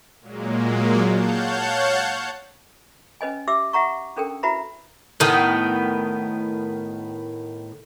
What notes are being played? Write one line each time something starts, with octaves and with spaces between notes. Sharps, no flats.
A#2 F#3 G#3 A#3
C#5 F5 F#5 A5 G6
C#4 B4 D#5 G#5
G4 E5 D6 E6
E5 F#5 A#5 C#6
C#4 D4 A4 A#4 G5
E4 F#4 B4 E5 A#5 B5
A2 D#3 B3